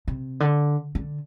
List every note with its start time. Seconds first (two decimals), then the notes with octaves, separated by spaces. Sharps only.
0.08 C3
0.40 D3
0.95 D3